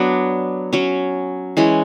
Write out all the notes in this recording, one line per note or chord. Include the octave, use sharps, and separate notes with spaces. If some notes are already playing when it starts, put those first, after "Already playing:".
Already playing: F#3 B3 D4
F#3 C#4
E3 G#3 C#4